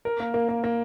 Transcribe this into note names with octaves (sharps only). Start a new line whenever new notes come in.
A#4
A#3
A#3
A#3
A#3